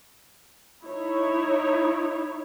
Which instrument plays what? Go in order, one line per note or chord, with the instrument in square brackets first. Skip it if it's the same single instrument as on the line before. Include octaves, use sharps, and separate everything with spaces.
[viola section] D#4 E4 C#5